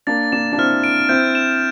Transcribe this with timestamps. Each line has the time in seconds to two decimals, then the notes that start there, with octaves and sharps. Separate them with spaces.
0.07 A#3 D4 A6
0.32 A#3 D4 E7
0.53 D4
0.58 C4 E4 F6
0.84 D7
1.09 C4 E4 G6
1.35 E7